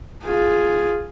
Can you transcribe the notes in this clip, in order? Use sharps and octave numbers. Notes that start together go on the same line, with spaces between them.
F4 G#4